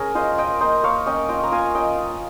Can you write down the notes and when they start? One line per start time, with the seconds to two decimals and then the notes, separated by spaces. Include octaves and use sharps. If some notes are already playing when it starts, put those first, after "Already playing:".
Already playing: C#4 G#4 A#4
0.15 F4 C5 D#5
0.38 F4 D#5 G5
0.61 A#3 C5 D#5
0.84 A#3 C#5 F5
1.06 C#4 D#5 G5
1.29 F4 D#5 G5
1.43 A#5
1.52 F4 F5 G#5
1.75 C#4 D#5 G5
1.98 F4